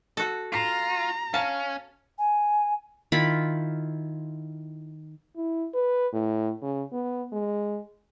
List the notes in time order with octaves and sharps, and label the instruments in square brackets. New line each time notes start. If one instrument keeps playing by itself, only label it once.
[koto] F#4 A4
[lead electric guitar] F4 [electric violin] A#5 [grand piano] B6 C7 E7
[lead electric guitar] C#4 [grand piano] F5 [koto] A5
[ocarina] G#5
[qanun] D#3 E4 F4 B5
[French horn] E4
B4
A2
C#3
B3
G#3